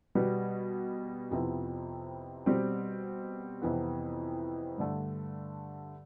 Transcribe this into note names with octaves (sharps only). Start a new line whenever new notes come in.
B2 G3 B3
F2 C3 F3 B3 E4
B2 G3 C4
F2 C3 E3 B3
G2 D3 A3